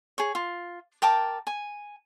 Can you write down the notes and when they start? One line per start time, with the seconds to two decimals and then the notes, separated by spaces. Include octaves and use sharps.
0.18 G#4 C#5
0.35 F4
1.02 A#4 G5 A5 D6
1.47 G#5